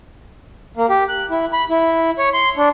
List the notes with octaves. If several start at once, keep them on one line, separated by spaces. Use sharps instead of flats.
A#3
G4
F#6
E4
B5
E4
C#5
C6
D4